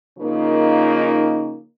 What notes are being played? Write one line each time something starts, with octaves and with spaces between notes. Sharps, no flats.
C#3 F3 A#3 D#4 A#4